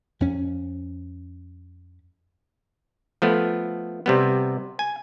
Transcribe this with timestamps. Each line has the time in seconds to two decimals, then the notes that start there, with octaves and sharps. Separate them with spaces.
0.20 F2 C#4
3.22 F3 A3 B3
4.06 C3 G3 B3
4.79 G#5